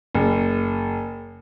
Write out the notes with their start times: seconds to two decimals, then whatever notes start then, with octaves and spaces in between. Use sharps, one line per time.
0.15 F#1